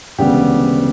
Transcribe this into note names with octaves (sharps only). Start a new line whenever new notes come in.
E1 D2 C#3 G3 B3 G4